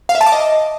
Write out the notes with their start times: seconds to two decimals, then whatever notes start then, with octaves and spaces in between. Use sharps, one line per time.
0.09 F5
0.15 E5
0.21 A5
0.26 D6
0.32 D#5